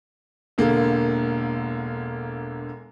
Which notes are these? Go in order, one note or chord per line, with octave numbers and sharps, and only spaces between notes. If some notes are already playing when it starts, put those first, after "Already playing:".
E1 D3 A#3